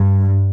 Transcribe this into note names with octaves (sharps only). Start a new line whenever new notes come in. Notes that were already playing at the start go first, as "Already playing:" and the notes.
Already playing: G2